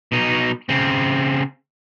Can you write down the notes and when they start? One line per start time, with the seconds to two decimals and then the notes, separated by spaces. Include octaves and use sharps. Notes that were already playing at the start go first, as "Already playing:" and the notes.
0.12 B2 D#4
0.69 C#3 C4